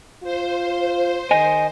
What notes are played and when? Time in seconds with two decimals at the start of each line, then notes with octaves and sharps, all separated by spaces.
0.24 F4 C5
1.31 D#3 D#5 G#5